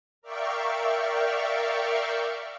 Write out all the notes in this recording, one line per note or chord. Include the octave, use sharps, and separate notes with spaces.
A#4 D5 E5 F5 G5 C#6